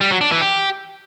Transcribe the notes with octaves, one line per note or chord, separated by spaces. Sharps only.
G3
F#3
D4
E3
G4